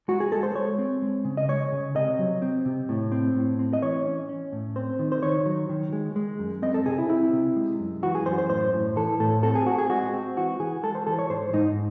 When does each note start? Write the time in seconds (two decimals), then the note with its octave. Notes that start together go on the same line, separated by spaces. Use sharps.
0.08 G#3 F#4
0.20 G#4
0.32 G#3 A4
0.43 C5
0.55 G#3 C#5
0.78 C4
1.02 G#3
1.25 C#3
1.37 D#5
1.48 G#3 C#5
1.72 C#3
1.95 C3 D#5
2.19 F#3
2.42 C4
2.65 C3
2.89 A2
3.12 C4
3.36 A2
3.59 C4
3.73 D#5
3.82 E3 C#5
4.05 C#4
4.29 C#4
4.52 A2
4.76 C4 C5
4.99 D#3
5.12 C5
5.23 D#3 C#5
5.46 F#3
5.69 D#3
5.93 G#3
6.16 G#3
6.39 F#2
6.62 C4 D#5
6.74 A4
6.86 C3 G#4
6.98 E4
7.09 C4 E4
7.33 C3
7.56 G#3
7.80 F#2
8.03 E3 F#4
8.15 G#4
8.26 F#2 C5
8.38 C5
8.49 A2 C5
8.73 A2
8.96 E3 A4
9.20 A2 A4
9.43 C4 A4
9.55 G#4
9.66 C4 F#4
9.78 G#4
9.90 G#3 F#4
10.14 C4
10.37 E3 F#4
10.60 E3 G#4
10.83 G#3 A4
10.95 C5
11.07 E3 A4
11.19 C#5
11.30 G#2 C5
11.53 G#2 D#4